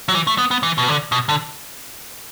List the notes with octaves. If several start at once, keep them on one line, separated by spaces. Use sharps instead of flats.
F#3
E3
A3
B3
B3
E3
B2
D3
B2
D3